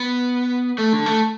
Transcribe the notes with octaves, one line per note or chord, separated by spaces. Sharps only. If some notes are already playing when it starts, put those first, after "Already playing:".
Already playing: B3
A3
D3
A3